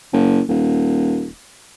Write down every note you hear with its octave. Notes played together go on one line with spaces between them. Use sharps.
F#1
D#1